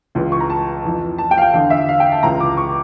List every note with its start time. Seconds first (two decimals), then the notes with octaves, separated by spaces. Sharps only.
0.15 C#2 C#3 E3
0.32 C#6
0.40 A#5
0.50 A5
0.85 F2 E3
1.18 A5
1.31 G5
1.38 F5
1.41 G5
1.54 E2 D3 F5
1.70 E5
1.89 F5
2.00 G5
2.12 A5
2.23 C#2 C#3 E3 A#5
2.40 D6
2.57 C#6